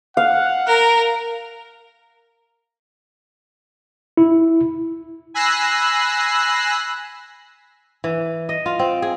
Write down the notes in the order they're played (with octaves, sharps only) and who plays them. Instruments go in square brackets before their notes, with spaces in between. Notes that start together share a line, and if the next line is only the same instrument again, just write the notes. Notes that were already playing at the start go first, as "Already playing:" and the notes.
[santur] F5 [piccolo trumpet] F#5
[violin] A#4 [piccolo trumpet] A#5
[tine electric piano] E4
[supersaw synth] G#5 B5 E6 F#6 A#6 C7
[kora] E3
D#5
F4
C4
G#4